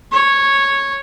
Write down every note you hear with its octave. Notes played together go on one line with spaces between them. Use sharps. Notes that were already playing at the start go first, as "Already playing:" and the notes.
C#5